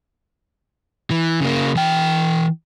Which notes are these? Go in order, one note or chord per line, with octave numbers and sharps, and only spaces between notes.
E3
C#3 A#3
E3 G5